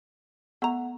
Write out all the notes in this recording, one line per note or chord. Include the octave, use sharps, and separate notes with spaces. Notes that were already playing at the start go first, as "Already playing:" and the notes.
A3 B3 F#5 A#5